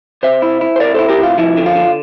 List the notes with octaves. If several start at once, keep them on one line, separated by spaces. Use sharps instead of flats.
C3 C5 E5
E4
E4
C5
C3 A#4 D5
E4 A4 C5
G4 A#4
C3 F4
F3 E4
D3
F4
D3